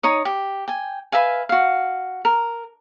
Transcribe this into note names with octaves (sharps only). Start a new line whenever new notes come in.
D#4 C#5 D#6
G4
G5 G#5
B4 E5 F5 G#5
F#4 F5
A#4